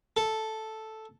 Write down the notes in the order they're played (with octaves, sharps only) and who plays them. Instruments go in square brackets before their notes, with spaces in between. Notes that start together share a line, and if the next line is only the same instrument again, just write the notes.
[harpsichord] A4